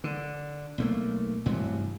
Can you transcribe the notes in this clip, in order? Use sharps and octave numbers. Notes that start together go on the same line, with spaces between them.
D3
B1 A3 A#3
A1 G2 C3 F#3